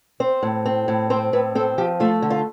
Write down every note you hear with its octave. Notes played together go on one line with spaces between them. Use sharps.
C4 C5
A2
C4
A2
C4 C5
A2 B4
C4 A4
F3 G4
A3 F4
D3
F4